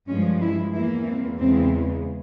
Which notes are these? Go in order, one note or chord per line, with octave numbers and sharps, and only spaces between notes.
G2 F3 G#3 C#4
E4
E2 E3 A#3 E4
C4
E2 C#3 E3 G#3 C4